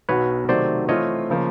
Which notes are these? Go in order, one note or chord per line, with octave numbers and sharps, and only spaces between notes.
B1 B2 F#3 B4 C#5
C3 D#3 F#3 A3 C5 D5
E3 A3 C4 F4 C#5 D#5
C#3 F3 A#3